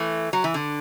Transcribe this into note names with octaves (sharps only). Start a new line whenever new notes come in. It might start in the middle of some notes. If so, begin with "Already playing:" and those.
Already playing: E3 A3
F#3
E3
D3